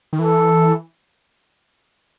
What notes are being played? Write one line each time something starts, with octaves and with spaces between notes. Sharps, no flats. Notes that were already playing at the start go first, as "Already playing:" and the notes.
D#3
E3 A4